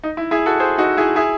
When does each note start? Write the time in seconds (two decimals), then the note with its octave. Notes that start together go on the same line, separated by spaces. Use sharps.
0.03 D#4
0.17 E4
0.31 E4 G#4
0.46 F#4 A4
0.60 G#4 C5
0.78 D#4 F#4
0.97 E4 G#4
1.16 E4 G#4